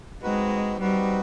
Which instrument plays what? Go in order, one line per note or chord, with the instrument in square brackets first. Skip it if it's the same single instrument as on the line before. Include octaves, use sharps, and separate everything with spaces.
[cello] G#3 [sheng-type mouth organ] C4 D#4 F#4 B4
[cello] G3 [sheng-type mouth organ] C4 D#4 F#4 B4